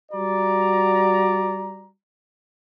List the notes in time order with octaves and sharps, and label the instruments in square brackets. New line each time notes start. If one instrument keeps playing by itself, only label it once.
[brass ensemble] G3 F#4 D5 A#5